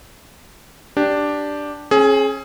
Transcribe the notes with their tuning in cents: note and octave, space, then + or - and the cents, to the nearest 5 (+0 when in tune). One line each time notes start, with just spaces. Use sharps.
D4 +0 G4 +0
C#4 -35 G#4 +20